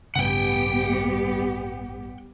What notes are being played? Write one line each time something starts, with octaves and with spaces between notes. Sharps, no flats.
A1 G2 C#3 G3 B3 G4 F#5 G5